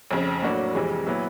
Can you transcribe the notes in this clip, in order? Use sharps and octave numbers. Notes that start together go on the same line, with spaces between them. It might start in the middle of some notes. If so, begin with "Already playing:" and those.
F1 F2 C#3
A2 F#3 A#3 D4 F#4
F1 F2 C3 E3 G#3
A#2 F#3 B3 E4